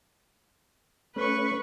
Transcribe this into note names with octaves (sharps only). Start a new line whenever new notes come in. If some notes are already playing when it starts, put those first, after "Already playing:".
A3 C#4 B4 C#6